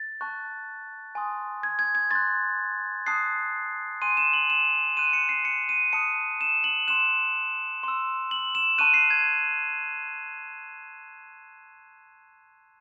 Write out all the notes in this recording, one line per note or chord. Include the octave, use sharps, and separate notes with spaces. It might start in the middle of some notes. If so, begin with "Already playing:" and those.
Already playing: A6
A5 C#6 F#6
G#5 C6 D#6
G#6
G#6
G#6
C6 F#6 A6
A5 D#6 F#6 C7
G#5 C6 F#6 D#7
E7
F#7
E7
C6 F#6 D#7
C#7
C7
C#7
D#7
A5 D#6 F#6 C#7
E7
F#7
C6 F#6 E7
C6 E6
F#7
E7
A5 C#6 F#6 D#7
C7
G#6